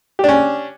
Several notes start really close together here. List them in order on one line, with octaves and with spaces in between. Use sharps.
G4 D4 C#4